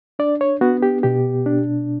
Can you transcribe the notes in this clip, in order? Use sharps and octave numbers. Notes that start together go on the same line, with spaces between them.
D4 D5
C#5
B3 F#4
G4
B2 G4
D4